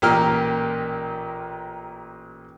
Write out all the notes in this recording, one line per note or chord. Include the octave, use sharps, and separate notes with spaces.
A1 A#2 A#3 G4 A#4 F6